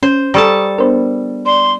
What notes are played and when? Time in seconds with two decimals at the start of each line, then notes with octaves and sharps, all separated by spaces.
0.03 C#4 C5
0.34 G3 A4 A5 A#5 C#6 D#6
0.78 B3 D4 A#4 C5
1.46 D5 C6